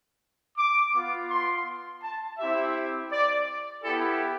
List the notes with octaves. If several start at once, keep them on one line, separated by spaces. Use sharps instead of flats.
D6
B3 F4
C6
A5
C4 E4 G4 E5
D5
B3 E4 G4 A4